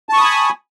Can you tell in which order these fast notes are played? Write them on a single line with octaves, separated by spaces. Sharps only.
A5 C#6 D#6 B5 G#5